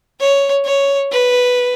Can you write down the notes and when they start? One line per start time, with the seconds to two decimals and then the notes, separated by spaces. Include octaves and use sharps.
0.20 C#5
0.65 C#5
1.12 B4